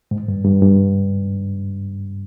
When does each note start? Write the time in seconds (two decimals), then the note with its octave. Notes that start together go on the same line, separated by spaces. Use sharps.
0.11 G#2
0.28 G2
0.45 G2
0.62 G2